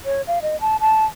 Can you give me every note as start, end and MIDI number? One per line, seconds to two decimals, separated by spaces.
0.05 0.22 73
0.27 0.39 77
0.42 0.59 75
0.61 0.77 81
0.80 1.05 81